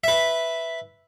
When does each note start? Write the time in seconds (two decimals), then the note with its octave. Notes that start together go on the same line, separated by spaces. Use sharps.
0.04 B4 E5